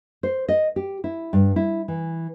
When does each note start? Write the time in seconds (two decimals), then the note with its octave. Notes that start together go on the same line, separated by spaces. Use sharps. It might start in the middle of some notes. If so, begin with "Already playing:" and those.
0.23 C5
0.49 D#5
0.76 G4
1.04 E4
1.33 G2
1.56 E4
1.88 E3